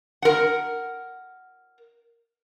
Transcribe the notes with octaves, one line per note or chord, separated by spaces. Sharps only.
A#4 F#5